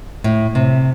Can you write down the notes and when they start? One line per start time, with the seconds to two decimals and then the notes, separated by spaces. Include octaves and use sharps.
0.24 A2
0.55 C3